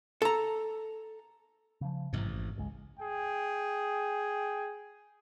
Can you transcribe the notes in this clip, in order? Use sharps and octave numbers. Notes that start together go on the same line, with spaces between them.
A4 A#5
C#3 F3
A1 F2 G#2 C3 F#3
G#1
G1 C#2 G#3
G#4 G5